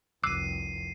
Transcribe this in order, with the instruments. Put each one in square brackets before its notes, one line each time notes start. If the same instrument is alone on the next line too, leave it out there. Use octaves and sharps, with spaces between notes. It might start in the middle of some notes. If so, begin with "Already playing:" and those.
[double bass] F1 C2 [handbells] D6 E6 F#6 [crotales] C7 D#7